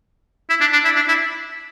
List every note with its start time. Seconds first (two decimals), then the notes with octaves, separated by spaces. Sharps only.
0.50 E4
0.61 D4
0.73 D4
0.85 E4
0.96 D4
1.08 E4